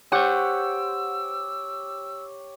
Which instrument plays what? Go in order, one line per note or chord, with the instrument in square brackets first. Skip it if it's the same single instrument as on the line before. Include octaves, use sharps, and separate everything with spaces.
[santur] G4 C#5 [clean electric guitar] C5 F#5 [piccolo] E6